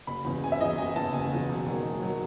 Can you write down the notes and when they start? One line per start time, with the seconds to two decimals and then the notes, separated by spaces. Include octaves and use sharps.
0.07 F#1 B5
0.25 E2 C#3 E3
0.44 F#1 G#5
0.52 E5
0.60 E2 C#3 E3 D#5
0.78 F#1 G#5
0.96 E2 C#3 E3 A5
1.14 F#1 G#5
1.32 E2 C#3 E3
1.49 E1
1.66 D#2 D#3 F#3
1.84 E1
2.02 D#3 F#3